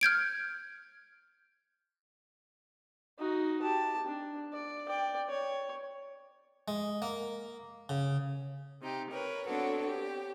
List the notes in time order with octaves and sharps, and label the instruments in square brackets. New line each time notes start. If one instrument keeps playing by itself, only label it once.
[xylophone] F6 G6 G#6 D7
[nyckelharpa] D#4 F#4
G4 A5
D4
D5
D5 G5
C#5
[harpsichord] G#3
A#3
C#3
[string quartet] C3 D#4 G4
A#4 B4 C#5
B3 C4 D4 F#4 A4 C#5
G4